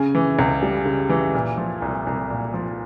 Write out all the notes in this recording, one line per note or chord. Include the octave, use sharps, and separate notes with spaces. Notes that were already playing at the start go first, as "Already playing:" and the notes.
Already playing: C#3 G#5
E3
C#2
G3
C#3
E3
A#2
F3
C2
C2
A#2
F3